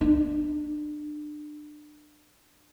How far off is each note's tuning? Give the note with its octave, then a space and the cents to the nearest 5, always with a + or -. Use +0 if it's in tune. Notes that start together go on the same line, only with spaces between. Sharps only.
D4 +30